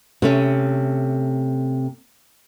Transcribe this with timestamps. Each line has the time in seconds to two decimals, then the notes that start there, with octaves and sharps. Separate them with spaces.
0.22 C3 A3 C#4